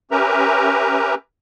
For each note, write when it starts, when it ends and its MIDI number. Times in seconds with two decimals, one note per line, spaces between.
0.11 1.14 61
0.11 1.14 67
0.11 1.14 70
0.11 1.14 71
0.11 1.14 76
0.11 1.14 82